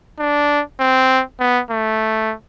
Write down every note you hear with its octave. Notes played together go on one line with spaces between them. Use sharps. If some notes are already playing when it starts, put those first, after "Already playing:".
D4
C4
B3
A3